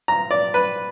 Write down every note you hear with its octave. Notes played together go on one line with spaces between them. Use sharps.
A#5
D5
B4